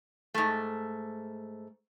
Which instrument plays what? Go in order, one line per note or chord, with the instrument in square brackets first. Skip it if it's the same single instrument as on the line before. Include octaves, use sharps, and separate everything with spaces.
[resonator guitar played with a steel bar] G#2 A3